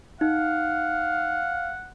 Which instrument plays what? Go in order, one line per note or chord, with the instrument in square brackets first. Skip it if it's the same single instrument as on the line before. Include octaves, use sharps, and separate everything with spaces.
[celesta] D#4 [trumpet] F5 [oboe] F#5